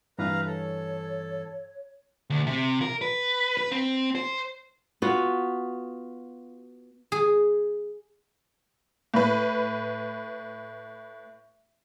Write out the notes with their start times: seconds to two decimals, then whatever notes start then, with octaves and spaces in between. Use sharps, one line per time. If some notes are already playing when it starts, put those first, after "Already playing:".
0.18 G2 E3 B4 F5 A#5
0.47 A4 C#5
2.30 D2
2.47 C3
2.82 A#4
3.01 B4
3.57 B4
3.72 C4
4.15 C5
5.02 B3 F4 F#4
7.12 G#4
9.14 A2 B4